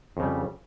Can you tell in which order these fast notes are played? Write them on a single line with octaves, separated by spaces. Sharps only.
F2 C#3 G3